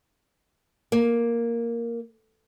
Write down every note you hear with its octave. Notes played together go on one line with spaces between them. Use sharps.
A#3